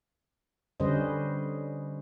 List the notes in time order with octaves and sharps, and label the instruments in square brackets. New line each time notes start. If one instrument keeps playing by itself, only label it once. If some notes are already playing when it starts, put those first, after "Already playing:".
[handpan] D3 G3 C#4 B4 C5 D#5